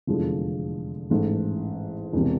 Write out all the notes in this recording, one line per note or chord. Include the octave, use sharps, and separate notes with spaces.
F1 E2 D3 F3 G#3
A1 G#2 E3 A3
E1 C3 E3